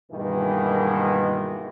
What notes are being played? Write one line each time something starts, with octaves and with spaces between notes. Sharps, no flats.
G2 B2 D#3 E3 G#3 A#3